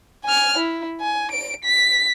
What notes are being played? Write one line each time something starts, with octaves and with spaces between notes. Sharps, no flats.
G#5 F6
E4
G#5
D7
B6